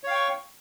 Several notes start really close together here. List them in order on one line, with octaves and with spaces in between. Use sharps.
C#5 F5 G5 C#6